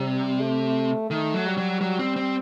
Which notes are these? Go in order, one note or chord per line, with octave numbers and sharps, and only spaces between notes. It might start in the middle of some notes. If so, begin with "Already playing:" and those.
Already playing: C3 G3
A3
D#3 A3
F#3
G3
F#3
F#3 G3
C4
C4